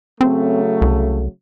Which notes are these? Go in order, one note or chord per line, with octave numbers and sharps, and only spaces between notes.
C#3 F#3 A3 C4
C2